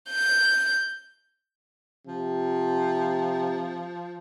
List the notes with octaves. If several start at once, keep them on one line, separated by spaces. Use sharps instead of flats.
G6
C3 F3